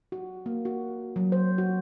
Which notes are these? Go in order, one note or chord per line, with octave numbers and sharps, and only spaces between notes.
F#4
A#3
F#4
F#3
C5
F#4